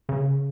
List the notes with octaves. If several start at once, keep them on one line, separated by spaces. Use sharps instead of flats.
C#3